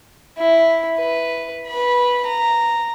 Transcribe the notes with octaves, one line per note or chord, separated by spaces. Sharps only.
E4
B4
B4 B5
A#5